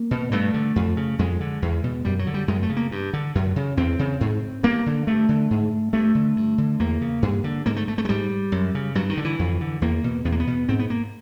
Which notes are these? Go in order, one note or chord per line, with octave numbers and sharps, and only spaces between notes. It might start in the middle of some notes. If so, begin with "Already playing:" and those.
Already playing: A#3
B2
G2 A3
D3
F2
C#3
F2 G#3
D3
E2
B2
F#2 G3
F#3
D3
G3
F#2 G#3
A3
C#3
A#3
G2
D3
F#2
C#3
E2 C4
C#3
G#2
G2 A#3
D3
G2 A3
D3
G#2
G2 A3
D3
G2
D3
E2 A#3
C#3
G2
D3
G#2 A#3
A3
A3
A3
G#3
G#2 G3
F#2
C#3
G2 F#3
D#3
D3
E3
F2
D3
E2 A#3
B2
E2 B3
A#3
B3
B2
G#2 C4
B3
A#3